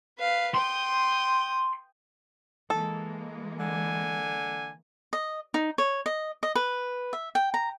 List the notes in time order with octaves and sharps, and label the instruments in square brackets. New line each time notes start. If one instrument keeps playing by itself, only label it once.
[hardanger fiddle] B4 F5
[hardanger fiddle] G5 D#6 [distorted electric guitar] C6
[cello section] E3 G#3 A#3 [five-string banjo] A4
[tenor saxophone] D3 [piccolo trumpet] G#5
[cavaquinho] D#5
D#4
C#5
D#5
D#5
B4
E5
G5
A#5